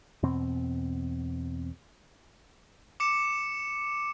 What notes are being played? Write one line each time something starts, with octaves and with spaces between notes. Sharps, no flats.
E2 B2 C4
D6 C#7 E7